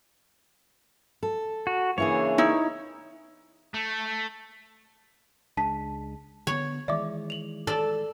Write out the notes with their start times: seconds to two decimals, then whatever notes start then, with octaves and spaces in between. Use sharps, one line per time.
1.23 A4
1.67 F#4
1.98 C#3 E3 A#3 D4 G#4 C#5
2.38 D#4 E4
3.74 A3
5.57 C#2 G#3 D4 A5 B6
6.47 D3 B3 C#5
6.88 D#3 E3 G#3 D5 E5 D6
7.30 F7 F#7
7.67 A4 D5